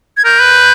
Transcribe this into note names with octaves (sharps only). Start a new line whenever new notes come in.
G#6
A#4 G6
B4